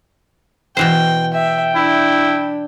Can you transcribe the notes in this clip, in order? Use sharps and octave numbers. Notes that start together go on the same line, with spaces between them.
B2 E3 C5 G5
E5 G5
D4 E4